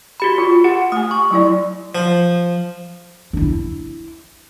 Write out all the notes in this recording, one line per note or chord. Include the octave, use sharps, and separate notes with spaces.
F#4 G4 B5
F4
G4 F#5
A3 G#5 D#6
C#6
F#3 E4 D5
F3
D4 E4